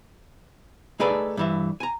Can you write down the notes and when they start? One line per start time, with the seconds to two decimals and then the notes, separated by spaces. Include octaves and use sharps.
1.00 A3 D#4 G#4 A4 B4 D5
1.37 G2 E3 E5
1.80 G#5 A#5